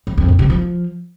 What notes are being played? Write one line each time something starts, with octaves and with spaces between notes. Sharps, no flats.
F2
F2
A#2
C3
F3